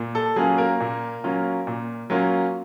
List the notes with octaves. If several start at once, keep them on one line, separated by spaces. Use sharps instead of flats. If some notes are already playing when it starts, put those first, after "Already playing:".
Already playing: A#2
A4
F#3 A#3 C#4 F4 G#4
A#3 A#4
A#2
F#3 A#3 C#4 F4
A#2
F#3 A#3 C#4 F4